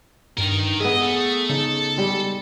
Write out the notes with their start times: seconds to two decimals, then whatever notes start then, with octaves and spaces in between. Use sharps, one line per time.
0.38 G2 D#3 A#4
0.80 B3 G#4 D#5 E5
1.02 A3
1.49 C#3 D#4 A4
1.97 G3 G#3